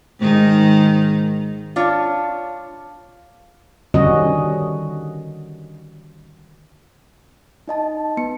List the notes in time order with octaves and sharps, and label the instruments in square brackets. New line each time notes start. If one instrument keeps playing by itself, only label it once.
[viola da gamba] G#2 D#3 D#4
[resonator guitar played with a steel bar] D4 F4 C#5
[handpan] D3 D#3 G3 C#4 F#4 D#5
[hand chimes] D#4 D#5 A5
B3 C#7